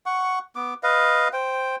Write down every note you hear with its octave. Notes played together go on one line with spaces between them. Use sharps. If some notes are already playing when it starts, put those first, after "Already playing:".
F#5 C#6
B3 D6
B4 D#5 F5
C5 G5